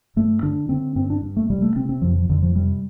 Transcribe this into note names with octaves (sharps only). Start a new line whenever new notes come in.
G2 A3
D3 D4
D3 C4
G2 C4
D4
G2
A3
C3 G3
A3
C3 C4
C4
F2 F3
F3
F2 D3
F3
C3 G3